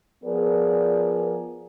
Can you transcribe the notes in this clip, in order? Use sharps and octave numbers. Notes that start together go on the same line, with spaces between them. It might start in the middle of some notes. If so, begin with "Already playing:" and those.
F3 B3 G#4 A#4 D5